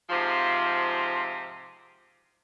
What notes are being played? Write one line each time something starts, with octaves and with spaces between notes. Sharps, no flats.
G#2 C3 F3